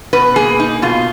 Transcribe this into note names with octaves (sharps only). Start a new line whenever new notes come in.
B2 B4
A#3 G#4
D#4
B2 F4